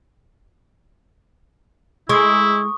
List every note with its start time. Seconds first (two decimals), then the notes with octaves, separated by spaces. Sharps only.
2.09 G#3 E4 C#6 D#6